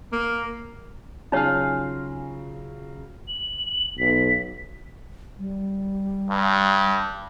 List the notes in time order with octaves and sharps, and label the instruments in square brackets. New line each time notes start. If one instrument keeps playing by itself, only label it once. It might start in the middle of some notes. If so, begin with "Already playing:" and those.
[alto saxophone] A#3
[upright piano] C#3 F#3 [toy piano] D#4 C#5 [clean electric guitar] F4 F5 G#5
[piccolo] F#7
[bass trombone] B1 [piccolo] B6
[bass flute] G3
[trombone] G2